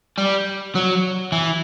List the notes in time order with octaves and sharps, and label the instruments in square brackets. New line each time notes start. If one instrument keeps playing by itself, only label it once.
[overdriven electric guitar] G3
F#3
E3